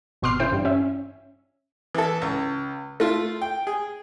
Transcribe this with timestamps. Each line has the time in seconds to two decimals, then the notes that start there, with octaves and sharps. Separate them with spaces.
0.22 G#1 B2 C6 D6 F6 C7
0.40 C#3 E3 C5 G5
0.52 G2
0.65 C#4 E5
1.95 E3 A4
2.22 C#2
3.00 A3 F4
3.42 G5
3.67 G#4